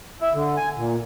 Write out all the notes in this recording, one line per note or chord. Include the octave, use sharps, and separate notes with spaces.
E4
D3
G#5
A#2